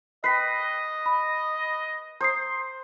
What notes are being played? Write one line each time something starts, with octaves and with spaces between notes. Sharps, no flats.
B4 D#5 G5 B6 C7
B5
C5 A#5 D#6 C7